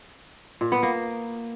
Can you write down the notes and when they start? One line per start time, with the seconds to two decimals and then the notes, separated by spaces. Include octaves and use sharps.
0.61 A#2
0.72 B3
0.83 A#3